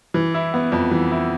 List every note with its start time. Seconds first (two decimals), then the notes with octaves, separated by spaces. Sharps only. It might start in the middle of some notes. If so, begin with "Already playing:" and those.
0.14 E3
0.34 E4
0.54 B3
0.72 F2
0.91 E3
1.11 E4